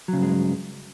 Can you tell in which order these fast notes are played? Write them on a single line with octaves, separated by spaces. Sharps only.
F#3 C#3 G2 G#3